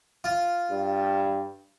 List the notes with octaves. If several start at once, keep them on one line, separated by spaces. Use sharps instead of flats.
F4
G2